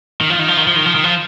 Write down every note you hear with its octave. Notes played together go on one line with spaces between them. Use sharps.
D#3
F3
D#3
F3
D#3
F3
D#3
F3
D#3
F3